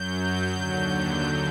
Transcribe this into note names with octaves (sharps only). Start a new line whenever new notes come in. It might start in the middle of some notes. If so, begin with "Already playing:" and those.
Already playing: F#2 F#3 G6
G6
D#2 D3 F#3